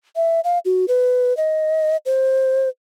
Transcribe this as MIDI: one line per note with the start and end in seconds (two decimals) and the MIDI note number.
0.16 0.40 76
0.44 0.59 77
0.65 0.86 66
0.88 1.36 71
1.37 1.97 75
2.06 2.69 72